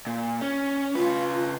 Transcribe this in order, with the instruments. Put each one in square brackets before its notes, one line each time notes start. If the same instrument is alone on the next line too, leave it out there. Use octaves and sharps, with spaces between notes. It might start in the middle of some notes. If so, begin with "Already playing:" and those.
[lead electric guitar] A#2
C#4
[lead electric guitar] C#3 B4 [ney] F4